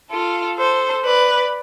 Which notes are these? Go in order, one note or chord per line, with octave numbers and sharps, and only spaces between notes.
F4 A4
A4 C5
B4 D5